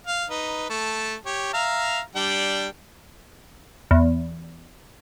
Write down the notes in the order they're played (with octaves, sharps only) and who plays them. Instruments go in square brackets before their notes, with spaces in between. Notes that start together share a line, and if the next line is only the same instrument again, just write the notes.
[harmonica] F5
D#4 B4
A3 A5
G4 C#5
E5 F5 A#5
G3 D4 G5
[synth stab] E2